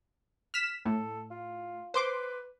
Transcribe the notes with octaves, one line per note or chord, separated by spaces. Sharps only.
F6 B6 E7
A2 A4
F4
B4 C5 C6 D6